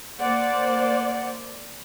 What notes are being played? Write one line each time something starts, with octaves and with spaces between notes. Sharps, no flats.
A#3 C5 D5 F#5